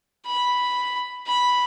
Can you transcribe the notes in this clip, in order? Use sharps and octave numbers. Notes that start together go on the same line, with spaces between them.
B5
B5